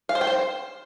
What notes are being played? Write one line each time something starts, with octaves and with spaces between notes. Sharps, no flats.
F5
C5
G5
C5